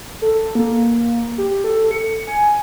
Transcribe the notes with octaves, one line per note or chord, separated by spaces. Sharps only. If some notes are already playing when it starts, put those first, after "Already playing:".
A4
A#3
G4
A4
C#7
G#5